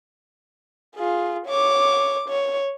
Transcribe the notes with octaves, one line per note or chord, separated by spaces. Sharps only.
F4 G#4
C#5 D6
C#5